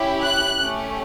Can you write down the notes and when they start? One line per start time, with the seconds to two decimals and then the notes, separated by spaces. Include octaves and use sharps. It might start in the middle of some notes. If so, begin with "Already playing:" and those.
Already playing: C#4 E4 G4
0.23 F#6
0.60 A3 C#4 G4